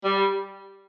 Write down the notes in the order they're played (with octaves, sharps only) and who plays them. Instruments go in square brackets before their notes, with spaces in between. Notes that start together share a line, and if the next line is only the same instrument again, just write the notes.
[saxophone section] G3